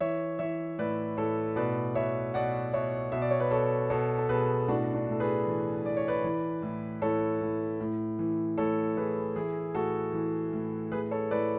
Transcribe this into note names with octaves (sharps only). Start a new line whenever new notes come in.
E3 C#5 E5
E3 C#5 E5
A2 B4 D5
A2 A4 C#5
B2 B4 D5
B2 C#5 E5
B2 D5 F#5
B2 C#5 E5
B2 E5
D5
C#5
B4 D5
B2 A4 C#5
B2 A4 C#5
A4
B2 G#4 B4
A2 D4 F#4
D4
A2 A4
G#4 B4
E3
E3 D5
C#5
B4 D5
E3
A2
A2 A4 C#5
A2
A2
E3
A2 A4 C#5
E3 G#4 B4
E3 E4 G#4
A2 F#4 A4
E3
A2
A2 G#4 B4
A4 C#5
A2 B4 D5